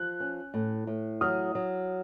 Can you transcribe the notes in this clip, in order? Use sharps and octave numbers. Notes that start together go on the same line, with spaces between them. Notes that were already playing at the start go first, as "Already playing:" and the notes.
Already playing: F3 F#6
C#4
A2
A2
F#3 D#6 F6
F#3